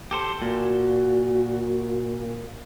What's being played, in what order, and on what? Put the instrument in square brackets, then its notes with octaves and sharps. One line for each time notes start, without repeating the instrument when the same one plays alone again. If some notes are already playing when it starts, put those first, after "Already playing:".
[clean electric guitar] G4 A4 C5
[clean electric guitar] A#2 [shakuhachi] F#4